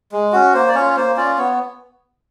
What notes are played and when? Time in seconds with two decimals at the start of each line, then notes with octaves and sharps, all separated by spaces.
0.12 G#3
0.32 C#4 F#4
0.54 A#3 C5
0.68 D5
0.75 C#4 F4 C#5
0.96 A#3 C5
1.17 C#4 F4 D5
1.38 B3 C#5